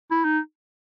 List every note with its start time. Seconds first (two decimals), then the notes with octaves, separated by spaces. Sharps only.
0.11 E4
0.24 D#4